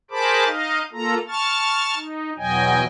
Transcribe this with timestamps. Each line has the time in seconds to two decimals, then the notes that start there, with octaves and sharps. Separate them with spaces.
0.11 G#4 A#4 C5 A5 B5 D6
0.46 D#4 D#5 F5
0.92 A#3 F4 A4 A#5
1.28 A5 C#6 F6 A6
1.96 D#4
2.38 E2 B2 F#3 D#5 G5 G#5